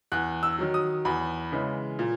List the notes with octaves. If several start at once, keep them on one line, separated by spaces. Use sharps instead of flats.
E2 F#6
E6
D#3 F#3
D#6
E2 B5
C#3 E3 G#3
A#2